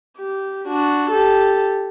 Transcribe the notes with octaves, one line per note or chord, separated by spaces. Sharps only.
G4
D4 F#4
G4 A4